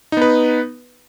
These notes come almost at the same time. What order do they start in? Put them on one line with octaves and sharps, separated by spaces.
D#4 B3 B4